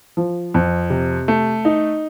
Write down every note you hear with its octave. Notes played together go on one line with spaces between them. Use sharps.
F3
F2
C3
A3
D#4